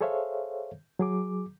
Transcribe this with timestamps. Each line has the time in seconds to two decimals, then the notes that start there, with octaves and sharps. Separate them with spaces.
0.01 G#4 A4 C5 C#5 E5 F5
0.99 F#3 G#4 D6